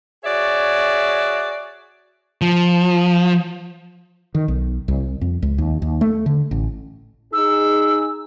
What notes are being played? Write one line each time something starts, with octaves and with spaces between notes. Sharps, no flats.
F#4 G#4 C#5 D5 E5
F3
D#3
B1
C2
F2
C#2
D#2
D#2
A3
D3
A1
D#4 G#4 E6